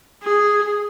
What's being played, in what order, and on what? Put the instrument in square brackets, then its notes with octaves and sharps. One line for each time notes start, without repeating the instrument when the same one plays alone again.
[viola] G#4